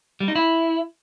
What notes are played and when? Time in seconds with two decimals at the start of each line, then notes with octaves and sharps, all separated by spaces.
0.20 G3
0.28 D#4
0.35 E4